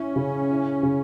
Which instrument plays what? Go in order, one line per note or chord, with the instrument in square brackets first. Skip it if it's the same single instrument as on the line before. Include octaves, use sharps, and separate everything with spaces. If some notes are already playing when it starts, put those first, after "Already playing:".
Already playing: [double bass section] C#4 [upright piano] E4
[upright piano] C#3
E4
C#3